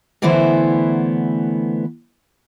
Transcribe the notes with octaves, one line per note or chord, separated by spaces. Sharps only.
D3 E3 A3 B3 E4 C5